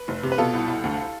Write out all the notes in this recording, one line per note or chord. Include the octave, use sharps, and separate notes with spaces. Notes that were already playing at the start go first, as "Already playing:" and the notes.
Already playing: B4
F1
C3
B4
B2 F4 A4
C2
C2
D2